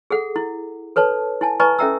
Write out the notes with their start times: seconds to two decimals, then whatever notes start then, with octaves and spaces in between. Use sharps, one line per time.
0.10 G#4 A4 F#5
0.36 E4
0.96 A4 B4 C#5 A5
1.41 E4 G#5 A5
1.60 B4 D#5 G#5 A#5 C#6
1.79 C#4 A4 E5 G5 A#5 E6